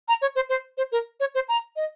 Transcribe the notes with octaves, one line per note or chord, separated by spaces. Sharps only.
A#5
C#5
C5
C5
C5
A#4
C#5
C5
A#5
D#5